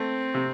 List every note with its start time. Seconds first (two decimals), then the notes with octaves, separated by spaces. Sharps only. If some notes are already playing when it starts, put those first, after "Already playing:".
Already playing: A3 C4
0.34 C3